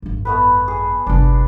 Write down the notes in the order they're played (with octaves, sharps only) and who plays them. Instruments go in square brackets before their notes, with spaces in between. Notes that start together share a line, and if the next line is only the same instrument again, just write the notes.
[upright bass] G#1 F#2
[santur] A3 B3 B4
G#4
[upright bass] G1 C2 [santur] D4